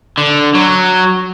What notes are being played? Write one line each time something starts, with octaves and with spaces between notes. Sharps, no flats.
D3
F#3